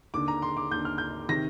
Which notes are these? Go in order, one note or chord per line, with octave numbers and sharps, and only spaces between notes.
D#2 D3 D6
A#5
C6
D6
D#2 D3 G6
F6
G6
C3 D#3 A#6